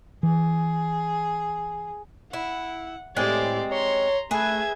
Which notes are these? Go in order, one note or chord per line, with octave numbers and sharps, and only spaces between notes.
E3 G#4
E4 F#5
A2 G#3 C4 G4 D5
C#5 A#5 C6
A3 G#4 B4 E5 G#6